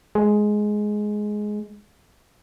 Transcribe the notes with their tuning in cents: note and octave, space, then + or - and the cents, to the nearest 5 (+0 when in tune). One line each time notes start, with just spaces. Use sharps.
G#3 +10